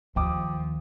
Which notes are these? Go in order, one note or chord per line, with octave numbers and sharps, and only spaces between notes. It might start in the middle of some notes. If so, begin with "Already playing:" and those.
D#2 F3 G5 D6 D#6